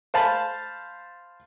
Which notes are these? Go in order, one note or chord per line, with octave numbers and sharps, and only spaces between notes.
C5 F5 A5 B5